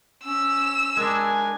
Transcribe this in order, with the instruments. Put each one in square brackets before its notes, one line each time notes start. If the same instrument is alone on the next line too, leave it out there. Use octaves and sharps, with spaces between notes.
[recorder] C#4 [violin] E6
[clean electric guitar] G#3 D4 [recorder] A#4 [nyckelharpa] G#5